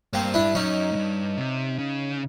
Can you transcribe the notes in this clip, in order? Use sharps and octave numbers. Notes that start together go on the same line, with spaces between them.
G2 A#3 C4
D4 E4
F#2 C#4 D#4
G#2
G2
C3
C#3